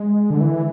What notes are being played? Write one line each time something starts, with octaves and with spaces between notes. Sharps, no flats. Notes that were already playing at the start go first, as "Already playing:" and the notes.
Already playing: G#3
D3
E3